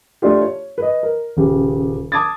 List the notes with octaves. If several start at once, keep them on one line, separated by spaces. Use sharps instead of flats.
A3 D4 F4 G4
C#5
B4 D#5
A#4
D#1 C#3 G4
A5 D6 D#6 G#6 A6